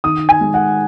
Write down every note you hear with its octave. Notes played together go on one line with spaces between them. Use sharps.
D#3 D#6
G#5
G#3
F#5